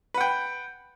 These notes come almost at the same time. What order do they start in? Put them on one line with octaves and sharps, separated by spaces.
B4 F#5 G5